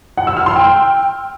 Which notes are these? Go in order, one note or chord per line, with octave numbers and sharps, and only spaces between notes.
F#5
E6
F6
C6
G5